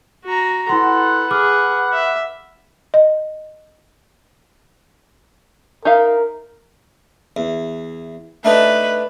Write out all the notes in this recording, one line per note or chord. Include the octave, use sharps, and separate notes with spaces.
F#4 A#5
E4 A4 B4 F#5 C6
G#4 D6 F6
E5
D#5
D#4 A#4 E5 F5
E2
A3 D4 D#4 B4